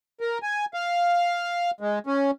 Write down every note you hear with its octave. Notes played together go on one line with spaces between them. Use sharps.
A#4
G#5
F5
G#3
C#4